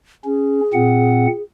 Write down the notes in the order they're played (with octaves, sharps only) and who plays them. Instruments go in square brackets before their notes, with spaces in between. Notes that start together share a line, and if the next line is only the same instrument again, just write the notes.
[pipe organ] C#4 [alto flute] G#4
[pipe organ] A#2 C4 F#5